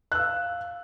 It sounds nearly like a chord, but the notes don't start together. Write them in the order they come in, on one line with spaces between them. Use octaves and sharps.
F#6 E6 F5